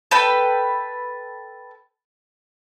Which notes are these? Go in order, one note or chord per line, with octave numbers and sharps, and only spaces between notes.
A4 B4 G5